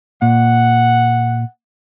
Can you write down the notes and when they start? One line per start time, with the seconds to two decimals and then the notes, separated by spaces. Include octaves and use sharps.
0.22 A#2 F#5